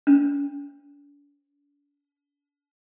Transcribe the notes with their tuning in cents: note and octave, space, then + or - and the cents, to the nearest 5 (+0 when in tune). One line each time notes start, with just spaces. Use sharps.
D4 -45